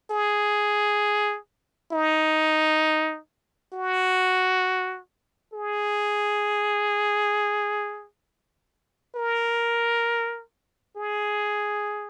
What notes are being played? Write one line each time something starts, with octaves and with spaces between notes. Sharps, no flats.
G#4
D#4
F#4
G#4
A#4
G#4